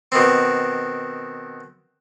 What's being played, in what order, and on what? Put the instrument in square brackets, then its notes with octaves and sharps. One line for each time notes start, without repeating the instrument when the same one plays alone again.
[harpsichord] B2 D#3 C4